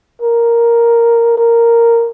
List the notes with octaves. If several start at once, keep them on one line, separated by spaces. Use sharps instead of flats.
A#4
A#4